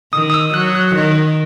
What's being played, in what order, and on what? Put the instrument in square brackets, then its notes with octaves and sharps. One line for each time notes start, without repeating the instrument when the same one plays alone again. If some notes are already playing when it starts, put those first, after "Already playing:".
[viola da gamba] D#3 [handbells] D#6
[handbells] D#6
E6
[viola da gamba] F#3 [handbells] F#6
[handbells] F#6
[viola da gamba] D#3